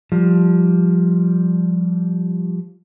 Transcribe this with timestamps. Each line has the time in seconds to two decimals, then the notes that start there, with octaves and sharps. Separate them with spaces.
0.12 F3 G3